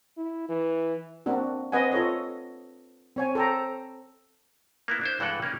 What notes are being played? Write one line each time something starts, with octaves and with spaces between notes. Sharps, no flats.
E4
E3
A#3 C4 D4 F#4
C4 B4 D#5 F#5 G#5
F4 A4 C#5 D#5
C4 C#5 G#5
A4 C5 G5 A#5
A#3 B3 E4
D4 E4 C5
G2 E3 G#3 A4 F#5 G5
A#3 C#4 D#4 A#4